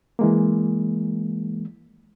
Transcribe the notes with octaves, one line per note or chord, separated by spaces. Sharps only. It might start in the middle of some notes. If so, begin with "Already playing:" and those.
E3 G#3 A#3